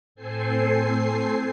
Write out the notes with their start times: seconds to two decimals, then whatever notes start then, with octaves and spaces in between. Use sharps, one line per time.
0.15 A2 C4 A4 C5 G#5 C7